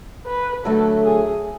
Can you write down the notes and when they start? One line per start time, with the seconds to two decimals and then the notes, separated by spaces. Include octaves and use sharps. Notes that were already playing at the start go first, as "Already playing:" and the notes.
0.26 B4
0.65 D3 F#3 A3 A4
1.04 G#4